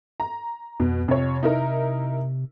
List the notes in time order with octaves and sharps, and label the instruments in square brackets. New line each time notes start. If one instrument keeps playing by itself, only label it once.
[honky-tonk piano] A#5
[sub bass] F2 [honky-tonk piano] B2
[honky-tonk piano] F2 C#5 [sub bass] C3
[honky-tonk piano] D#4 E4 A#4